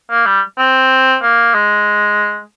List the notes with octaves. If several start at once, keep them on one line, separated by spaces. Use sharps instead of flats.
A#3
G3
C4
A#3
G#3